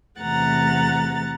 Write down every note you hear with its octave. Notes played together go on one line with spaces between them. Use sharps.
E2 C3 A3 F#5 A#5 A6